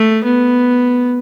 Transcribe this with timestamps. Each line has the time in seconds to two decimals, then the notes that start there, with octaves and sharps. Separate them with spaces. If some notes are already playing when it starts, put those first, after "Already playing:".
Already playing: A3
0.24 B3